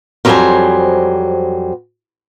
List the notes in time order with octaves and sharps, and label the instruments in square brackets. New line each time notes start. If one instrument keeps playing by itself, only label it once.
[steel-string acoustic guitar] F2 F#3 G3 C#4 C5 G#5